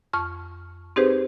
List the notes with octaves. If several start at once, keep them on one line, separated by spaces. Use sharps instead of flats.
F2 C#6 F6
C4 D#4 G4 G#4 B4 C5